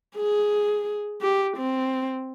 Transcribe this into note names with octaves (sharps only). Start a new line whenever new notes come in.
G#4
G4
C4